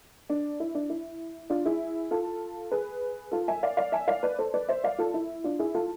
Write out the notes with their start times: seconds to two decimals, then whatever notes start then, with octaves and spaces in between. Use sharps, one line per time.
0.30 D4
0.60 E4
0.75 D4
0.90 E4
1.50 D4 F4
1.66 E4 G#4
2.11 F4 A4
2.72 G#4 B4
3.32 F4 A4
3.48 E5 G#5
3.63 D5 F5
3.77 D5 F5
3.92 E5 G#5
4.08 D5 F5
4.23 B4 D5
4.39 A4 C5
4.54 B4 D5
4.69 C5 E5
4.84 D5 F5
4.98 F4 A4
5.14 E4
5.44 D4 F4
5.59 E4 G#4
5.75 F4 A4